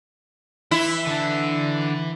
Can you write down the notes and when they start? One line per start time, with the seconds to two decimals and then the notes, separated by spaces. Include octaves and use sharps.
0.71 E3 E4
1.07 D3 D4